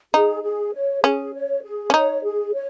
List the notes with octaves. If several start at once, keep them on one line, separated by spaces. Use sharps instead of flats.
D#4 G#4
G#4
C#5
C#4 G#4
C#5
G#4
C#4
D#4 C#5
G#4
C#5